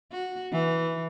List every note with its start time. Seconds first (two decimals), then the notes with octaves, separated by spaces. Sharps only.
0.12 F#4
0.52 E3